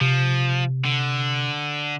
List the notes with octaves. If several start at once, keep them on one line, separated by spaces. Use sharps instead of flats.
C3 F3
D3